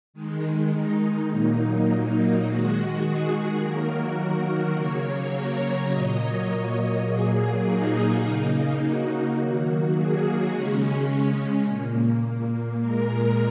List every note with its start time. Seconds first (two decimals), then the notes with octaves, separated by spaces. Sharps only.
0.14 D#3 G#3
0.72 D#4
1.00 D#4
1.29 A#2 F#3 A#3 D#4
1.87 D#4
2.16 D#4
2.45 D#3 G#3 F#4
3.02 G#4
3.60 D#3 F#3 A#3 A#4
3.89 F#4
4.17 A#4
4.75 C#3 F#3 A#3 C#5
5.04 C#5
5.32 A#4
5.62 C#5
5.90 A#2 F#3 A#3 D#5
6.19 C#5
7.05 A#2 F#3 A#3 G#4
7.63 D#4
8.20 C#3 A#3 D#4
8.78 F#4
9.35 D#3 F#3 A#3
9.93 G#4
10.22 G#4
10.51 C#3 G#3 C#4
10.79 C#4
11.65 A#2 A#3
12.81 A#2 G#3 A#4